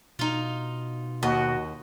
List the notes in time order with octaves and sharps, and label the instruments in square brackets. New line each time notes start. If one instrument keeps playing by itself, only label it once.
[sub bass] B2 [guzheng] D#4 F4
[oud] D#2 [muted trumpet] F#4 [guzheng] D#5